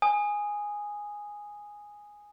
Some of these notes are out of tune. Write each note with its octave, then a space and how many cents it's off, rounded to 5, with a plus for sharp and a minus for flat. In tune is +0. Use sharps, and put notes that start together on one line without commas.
G#5 -5 D#6 -5